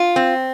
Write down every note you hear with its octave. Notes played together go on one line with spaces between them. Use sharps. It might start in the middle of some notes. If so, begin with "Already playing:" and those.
Already playing: F4
C4